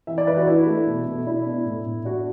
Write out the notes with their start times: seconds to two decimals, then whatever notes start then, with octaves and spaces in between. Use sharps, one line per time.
0.07 E3 E5
0.18 D5
0.27 E3 B4
0.37 F#4
0.47 D4 E4
0.67 A3
0.86 B2
1.06 B2
1.27 D4 E4
1.45 B3
1.66 A2
1.86 A2
2.05 D4 F#4